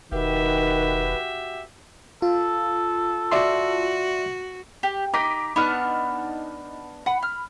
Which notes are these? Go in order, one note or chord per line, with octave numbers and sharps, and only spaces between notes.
E1 D#3 F#4 G4 B4 E5
F4 A4
F#4 D5 E5 C6
G4
D#4 D6 B6 D7
B3 D4 D#4 F#5 F6
F#5 B5
F6